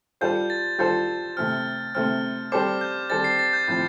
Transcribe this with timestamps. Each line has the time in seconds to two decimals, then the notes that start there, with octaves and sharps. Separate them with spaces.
0.21 G3 F4 A4 C5 G6
0.50 A6
0.78 G3 F4 A4 C5 G6
1.37 C3 A3 C4 F6
1.95 C3 A3 C4 F6
2.52 G3 C4 A4 C5 D6
2.81 G6
3.10 G3 C4 A4 C5 A6
3.24 C7
3.39 A6
3.53 G6
3.68 A2 F3 C4 G6